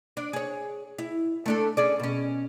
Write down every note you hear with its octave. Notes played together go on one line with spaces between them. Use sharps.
D4
G#4 C#5
E4
A3 D4 A4
C#4 G#4 D5
B2 C#4